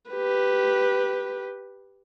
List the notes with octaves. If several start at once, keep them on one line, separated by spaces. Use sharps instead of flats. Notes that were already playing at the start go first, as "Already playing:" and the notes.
G4 B4